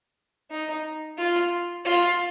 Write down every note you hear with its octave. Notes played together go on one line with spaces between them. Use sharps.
D#4
F4
F4